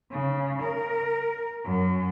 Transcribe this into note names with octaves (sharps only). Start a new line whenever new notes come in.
C#3
A#4
F#2